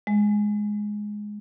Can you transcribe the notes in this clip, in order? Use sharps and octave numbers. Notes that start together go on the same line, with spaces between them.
G#3